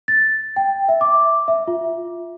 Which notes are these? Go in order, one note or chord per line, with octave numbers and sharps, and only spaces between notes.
A6
G5
E5
D6
E5
F4